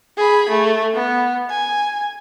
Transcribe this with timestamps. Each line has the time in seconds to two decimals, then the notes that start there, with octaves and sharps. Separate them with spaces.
0.17 G#4 B5
0.49 A3
0.94 B3
1.50 G#5